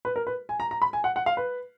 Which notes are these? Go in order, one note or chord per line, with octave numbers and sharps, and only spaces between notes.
B4
A#4
B4
G#5
A#5
A#5
B5
G#5
F#5
F#5
F5
B4